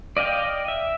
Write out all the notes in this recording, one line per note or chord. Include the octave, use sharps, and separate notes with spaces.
D5 D#5 F5 G5
E5